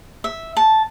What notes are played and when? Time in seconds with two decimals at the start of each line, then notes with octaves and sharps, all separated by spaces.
0.24 E5
0.57 A5